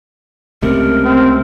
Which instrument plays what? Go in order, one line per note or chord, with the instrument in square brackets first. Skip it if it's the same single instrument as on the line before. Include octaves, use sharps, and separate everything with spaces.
[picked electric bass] C#2 C3 [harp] A3 [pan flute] A#4
[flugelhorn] C4